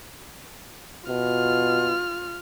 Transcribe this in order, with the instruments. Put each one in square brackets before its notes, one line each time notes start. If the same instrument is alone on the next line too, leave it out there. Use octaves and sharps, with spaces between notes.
[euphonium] B2 [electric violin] F4 F6